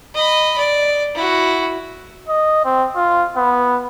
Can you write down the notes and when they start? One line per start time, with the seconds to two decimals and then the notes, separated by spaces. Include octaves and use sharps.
0.15 D#5 B5
0.58 D5
1.15 E4 F#4
2.29 D#5
2.65 C4
2.96 F4
3.37 B3